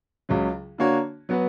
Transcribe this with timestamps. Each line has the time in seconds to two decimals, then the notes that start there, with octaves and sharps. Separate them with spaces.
0.29 C#2 C#3 F#3
0.78 D3 A#3 D4 F#4 C#5
1.29 F#3 B3 F#4 B4